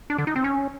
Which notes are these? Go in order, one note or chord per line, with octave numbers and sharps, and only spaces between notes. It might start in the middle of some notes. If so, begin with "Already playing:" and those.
D4
D3
D#4
C4
C#4